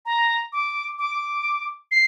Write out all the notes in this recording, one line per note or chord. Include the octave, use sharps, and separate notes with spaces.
A#5
D6
D6
C7